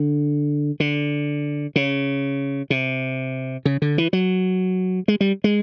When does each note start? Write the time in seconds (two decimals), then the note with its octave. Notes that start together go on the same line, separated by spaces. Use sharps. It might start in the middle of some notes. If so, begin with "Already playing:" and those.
Already playing: D3
0.80 D3
1.76 C#3
2.70 C3
3.65 C#3
3.82 D3
3.98 E3
4.13 F#3
5.08 G#3
5.21 G3
5.44 G#3